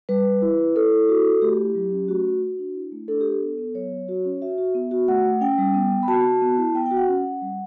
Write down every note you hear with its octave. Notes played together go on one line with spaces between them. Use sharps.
G3 B4
G3
E4
E4
E4 A4
E4
F#4
F#4
A3 G4
E4
F#3
C#4
A3 F#4
A3
F#4
D4
E4
A3
D4 A4
D4 G4
A4
B3
B3
F#3 C#5
F#3
F#4
C#4
F#4 E5
F#4
B3
F#4
A3 F#5
A3
C#4 G5
G3
B3
B3
B5
F#4 A5
F#4
B3
E4
B3 G5
G5
F#4
F#5
C#4
C#4
G3